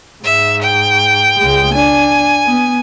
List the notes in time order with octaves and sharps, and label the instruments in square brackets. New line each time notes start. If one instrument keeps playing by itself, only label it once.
[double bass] G#2 [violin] E5
[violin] G5
[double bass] C#2 G#3
[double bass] D4 [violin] G#5
[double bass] B3